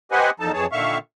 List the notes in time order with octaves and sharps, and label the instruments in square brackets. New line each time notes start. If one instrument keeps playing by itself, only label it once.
[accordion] G4 B4 C5 D#5 F#5 G#5
E2 A#2 F3 D#4 A4 A5
F2 E3 G#4 C#5 A5
A#2 D3 D#3 E5 F5 C#6